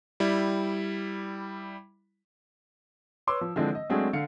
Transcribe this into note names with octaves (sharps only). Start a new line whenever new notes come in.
G3 E4
B4 C#5 C6 D6 E6
F3
D3 E3 F3 G#3 C4 D4
D#5
F#3 G#3 A3 C4 D4 G#4
D3 F5 C#7